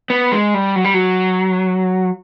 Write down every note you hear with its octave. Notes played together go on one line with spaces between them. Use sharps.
B3
G#3
G3
F#3
G3
F#3